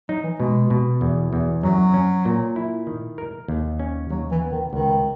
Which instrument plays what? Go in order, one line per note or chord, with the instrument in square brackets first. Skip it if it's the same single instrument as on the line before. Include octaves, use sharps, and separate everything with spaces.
[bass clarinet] F#3 [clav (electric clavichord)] D#4
[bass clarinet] E3
[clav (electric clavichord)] B2 [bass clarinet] G#3
[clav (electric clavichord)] B2
E2
E2
[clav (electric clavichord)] F#2 [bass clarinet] F#3
[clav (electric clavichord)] C#4
A#2
E4
D#3
A#4
D#2
C#4
[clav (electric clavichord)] D#2 [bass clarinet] F#3
[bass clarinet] E3
[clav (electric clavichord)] B3
[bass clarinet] D#3
[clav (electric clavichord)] C#2 [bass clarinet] D#3